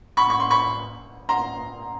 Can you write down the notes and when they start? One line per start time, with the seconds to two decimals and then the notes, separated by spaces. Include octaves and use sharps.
0.17 B5 C#6
0.30 C#6
0.40 C6
0.51 B5 C#6
1.29 A#5 C6